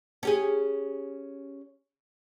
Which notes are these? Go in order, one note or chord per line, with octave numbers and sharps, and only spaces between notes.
C#4 G4 G#4